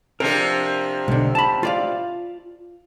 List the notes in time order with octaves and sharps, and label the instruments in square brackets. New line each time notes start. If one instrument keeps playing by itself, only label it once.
[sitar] C3 F3 D4 [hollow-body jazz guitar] A#4
[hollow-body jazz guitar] B1 D3
A5 B5
F4 D5 F5